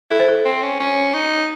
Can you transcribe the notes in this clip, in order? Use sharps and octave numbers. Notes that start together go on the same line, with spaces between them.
E4 A4
C5
A4
C4
C#4
C#4
D#4